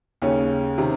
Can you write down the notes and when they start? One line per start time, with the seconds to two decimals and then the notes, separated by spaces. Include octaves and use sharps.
0.22 D#2 C#3 C#4
0.78 C3 D#3